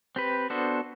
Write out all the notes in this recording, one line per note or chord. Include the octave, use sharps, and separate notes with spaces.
C4 G4 B4
B3 D4 F#4 A4 C5